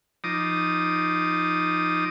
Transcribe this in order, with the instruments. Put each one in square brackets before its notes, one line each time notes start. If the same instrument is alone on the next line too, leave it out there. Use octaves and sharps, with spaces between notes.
[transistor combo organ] F3 D#4 D6 D#6